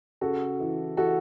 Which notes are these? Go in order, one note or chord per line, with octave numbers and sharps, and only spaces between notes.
C#3 F#4 A4
E3
E3 F#4 A4